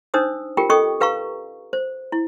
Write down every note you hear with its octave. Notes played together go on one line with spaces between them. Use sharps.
D4 D#4 C5 D#6 E6
F4 G4 A#4 G5
C#4 A4 D#5 G5 C#6 D#6
G4 B4 F5 A#5 C#6
C5
E4